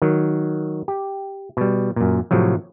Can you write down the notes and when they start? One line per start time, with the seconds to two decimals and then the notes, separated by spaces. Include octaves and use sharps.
0.02 D#3 F#3
0.88 G4
1.57 B2 G3
1.96 F#2 A#2
2.31 A2 C3 F3 F#3